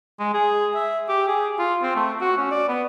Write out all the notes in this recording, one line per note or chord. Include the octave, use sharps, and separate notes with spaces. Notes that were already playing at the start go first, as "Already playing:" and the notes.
G#3
G#4
E5
G4
G#4
F4
C4
A3
F#4
C#4
D5
B3